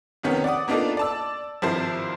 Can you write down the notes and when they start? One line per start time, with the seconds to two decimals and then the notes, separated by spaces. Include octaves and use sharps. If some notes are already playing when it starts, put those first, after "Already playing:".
0.23 F2 C3 D#3 B3 C#4
0.44 D5 F#5 D6 D#6
0.68 A#3 B3 D4 D#4 F4 A4
0.97 D5 A5 E6
1.62 G#1 G2 F3 E4 C5 A5